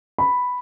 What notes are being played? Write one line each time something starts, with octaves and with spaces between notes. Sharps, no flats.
B5